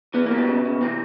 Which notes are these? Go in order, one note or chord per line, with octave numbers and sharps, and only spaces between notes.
E3 B3
G3 A#3
B2 B3
C#3
C#3
C3 E3 C4